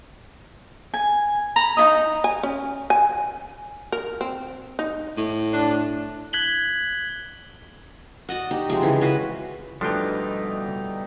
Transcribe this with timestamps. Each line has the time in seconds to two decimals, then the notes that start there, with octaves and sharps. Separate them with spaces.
0.94 G#5
1.56 A#5 B5
1.77 D#4 E4 D#5 D#6
2.24 G#5
2.43 C#4
2.90 G#5
3.92 A#4
4.21 C4
4.79 D#4
5.17 A2
5.53 D4
6.33 F#6 G#6 B6 F#7 G7
8.29 F#4 D5 D#5 F#5
8.51 D#4 G4
8.69 C3 F3 G#3
8.82 C#3 E3
9.01 C#4 F#4 B4
9.81 D2 B2 E3 F3 G3 D4 D#4 G5